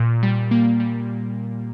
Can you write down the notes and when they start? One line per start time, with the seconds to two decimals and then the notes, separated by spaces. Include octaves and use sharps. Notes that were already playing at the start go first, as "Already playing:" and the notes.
Already playing: A#2
0.23 G3
0.51 A#3
0.80 G3